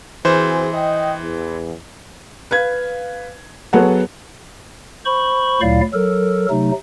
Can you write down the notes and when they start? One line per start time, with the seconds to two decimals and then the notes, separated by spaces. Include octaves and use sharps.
0.25 E3 C4 F#4 G#4 C5
0.73 D#5 G5
1.19 E2
2.51 B4 F5 G#6
3.73 F#3 B3 G#4 A4 C#5 F#5
5.05 C5 B5 C#6
5.61 D2 A#2 F#3 E4 D5 F5
5.93 F#3 A4 A#4
6.50 C3 F#3 A3 D#4